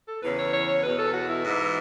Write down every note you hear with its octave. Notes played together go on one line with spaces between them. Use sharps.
A4
E2 C#3 E3 B4
C#5
C#5
C#5
E2 B2 B4
A4
F#4
E4
G#2 E3